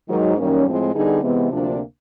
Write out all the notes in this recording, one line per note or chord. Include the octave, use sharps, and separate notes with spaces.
G#2 D#3 F#3
F#2 D#3 G3 A#3 C#4
A2 F3 G#3 C4
D3 G3 B3 D#4 G#4
C3 E3 G#3 B3
D2 C3 F3 A#3 D4